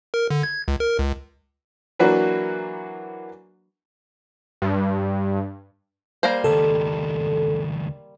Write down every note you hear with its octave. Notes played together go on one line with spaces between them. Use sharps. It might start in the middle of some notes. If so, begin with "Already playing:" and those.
A#4
D3
G#6
C#2
A#4
C#2
E3 F#3 A#3 D4 F#4 B4
G2
G3 A#3 C5
C#2 D#3 A4